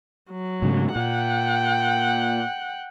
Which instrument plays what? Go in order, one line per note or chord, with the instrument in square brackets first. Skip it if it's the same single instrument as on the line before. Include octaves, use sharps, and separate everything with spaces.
[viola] F#3
[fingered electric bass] G#2 C#3 A3
[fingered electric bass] A#2 [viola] F#5 G5